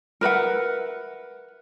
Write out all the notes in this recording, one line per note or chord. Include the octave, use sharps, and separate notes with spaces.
A#4 B4 E5 F#5